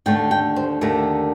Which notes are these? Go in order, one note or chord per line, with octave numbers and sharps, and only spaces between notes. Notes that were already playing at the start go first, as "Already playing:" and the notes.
D#2 D3 A3 G5
G5
C5
D#2 D3 A3 A#4